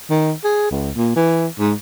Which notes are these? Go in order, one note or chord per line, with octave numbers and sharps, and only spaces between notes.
D#3
G#4
C#2
A#2
E3
G#2